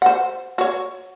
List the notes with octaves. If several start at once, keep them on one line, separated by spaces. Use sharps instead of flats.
C5 F#5
F#4 C#5